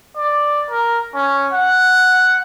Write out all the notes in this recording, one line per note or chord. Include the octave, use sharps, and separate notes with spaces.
D5
A#4
C#4
F#5